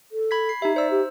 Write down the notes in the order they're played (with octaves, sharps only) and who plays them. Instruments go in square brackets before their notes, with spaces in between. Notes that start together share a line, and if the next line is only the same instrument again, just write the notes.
[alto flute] A4
[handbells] B5 G#6 B6
C7
[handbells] D#4 E5 [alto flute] G4
[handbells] C5 E6 [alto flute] D5
[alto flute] G4